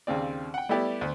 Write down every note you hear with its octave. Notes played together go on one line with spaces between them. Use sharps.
D#2 C#3 C4 D5
F#5 G5
G3 A3 B3 E4 G4 D5
D2